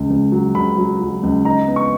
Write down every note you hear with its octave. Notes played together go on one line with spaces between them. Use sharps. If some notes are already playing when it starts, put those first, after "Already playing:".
Already playing: C#2 C#3
C#2
F#3
C#3 B5
F#3
F#3
C#2
D#4 A#5
B3
C#6